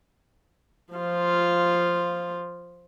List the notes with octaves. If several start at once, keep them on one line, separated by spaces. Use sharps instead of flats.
F3 F4